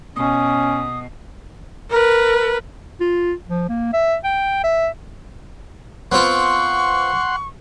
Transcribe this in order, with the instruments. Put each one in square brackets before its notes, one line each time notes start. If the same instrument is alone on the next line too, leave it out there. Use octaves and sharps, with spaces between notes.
[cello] B2 [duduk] C#4 [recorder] D#6
[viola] A#4 B4
[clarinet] F4
F3
A#3
E5
G5
E5
[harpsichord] B3 C4 F4 [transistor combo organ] F#5 C6 [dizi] C#6